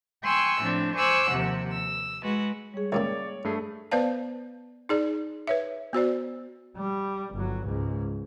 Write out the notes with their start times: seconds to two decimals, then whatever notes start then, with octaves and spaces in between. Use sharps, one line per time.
0.24 G5 G#5 C6 C#6 E6 F#6
0.62 A2 F3 C4 D4
0.96 C5 G#5 C#6 D6 E6 F#6
1.30 D#2 C3 F3 F#5
1.71 E6
2.23 G#3 F#4 B4
2.74 G3 G#4 C#5
2.92 C#2 A#2 C#3 C#5 D5 G5
3.44 G2 A3 G#4
3.91 B3 B4 C5 D5 F5 A5
4.89 D#4 G#4 D5
5.47 B4 C#5 E5
5.93 B3 F#4 C5 D5
6.77 G3
7.33 G1 F#3
7.65 C#2 G#2